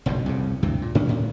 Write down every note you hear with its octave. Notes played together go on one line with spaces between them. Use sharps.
F#1 B1 G2 B2
C2 F2 C#3
D2 G2 C3 E3
A#2
G#2 D#3 C#4 D4
D2 A2